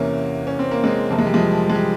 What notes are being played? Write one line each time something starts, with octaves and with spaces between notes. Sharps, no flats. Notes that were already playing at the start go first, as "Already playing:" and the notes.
Already playing: E2 C3 E3 A#3 C#4
C#4
C4
A#3
G#3 C4
F2 C3 E3 A#3
G#3
G3
F3 G#3
G#3
G3